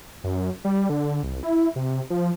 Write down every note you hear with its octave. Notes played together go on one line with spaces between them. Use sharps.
F#2
G3
D3
C2
E4
C3
F3